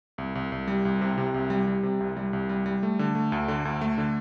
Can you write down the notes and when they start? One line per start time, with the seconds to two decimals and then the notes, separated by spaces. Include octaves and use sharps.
0.18 C2
0.35 C2
0.52 C2
0.68 G3
0.85 C2
1.01 C3
1.18 C3
1.34 C2
1.50 G3
1.67 G3
1.83 C3
2.00 C2
2.17 G3
2.33 C2
2.49 G3
2.66 G3
2.83 A3
2.99 D3
3.15 A3
3.32 D2
3.48 D3
3.65 D2
3.81 A3
3.98 D3